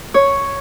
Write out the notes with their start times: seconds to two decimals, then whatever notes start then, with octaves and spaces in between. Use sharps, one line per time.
0.14 C#5